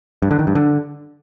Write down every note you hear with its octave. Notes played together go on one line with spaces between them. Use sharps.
G2
D3
D#3
G2
D3